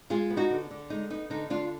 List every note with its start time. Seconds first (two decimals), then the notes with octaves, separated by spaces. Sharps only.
0.10 G#3 F4 G#4
0.30 B3
0.37 D#4 F#4
0.50 D3
0.71 D3
0.90 G#3 D#4
1.10 B3 D#4
1.30 D3 D#4
1.50 D3 D4 F4